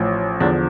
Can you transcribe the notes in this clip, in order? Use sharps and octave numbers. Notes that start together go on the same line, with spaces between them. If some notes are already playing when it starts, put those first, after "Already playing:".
Already playing: A1 A2 F3
E2 D3 F3 D4